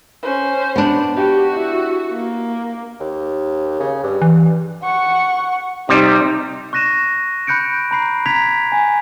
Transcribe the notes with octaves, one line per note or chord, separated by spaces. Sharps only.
C#4 C5
B3 D4
F#4 G4
E4
A#3
D#2
C#3
G2
E3
F#5 C#6
C3 G3 D#4
C#6 F#6 A#6 D#7 E7
B5 F#6 G6 C#7 D7
A#5 B5 C7
A#5 G#6 B6 F7
G#5